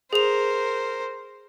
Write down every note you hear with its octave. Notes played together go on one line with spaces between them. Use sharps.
G#4 A#4 C5 F7